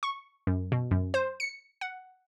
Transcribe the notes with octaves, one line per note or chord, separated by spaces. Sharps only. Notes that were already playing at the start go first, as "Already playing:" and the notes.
C#6
F#2
B2
F#2
C5
C#7
F#5